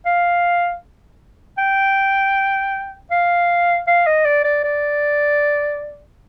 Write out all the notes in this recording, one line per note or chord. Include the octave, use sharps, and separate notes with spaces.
F5
G5
F5
F5
D#5
D5
D5
D5